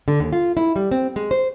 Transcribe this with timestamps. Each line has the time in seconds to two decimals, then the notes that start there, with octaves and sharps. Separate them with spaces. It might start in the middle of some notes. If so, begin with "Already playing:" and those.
0.08 D3
0.20 D#2
0.33 F4
0.57 E4
0.76 G3
0.91 C4
1.16 G#3
1.31 C5